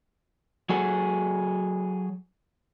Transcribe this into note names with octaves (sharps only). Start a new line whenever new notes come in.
F#3 F#4 G#4 A4 F#5